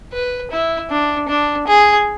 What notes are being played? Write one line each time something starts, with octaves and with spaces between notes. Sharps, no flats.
B4
E4
D4
D4
G#4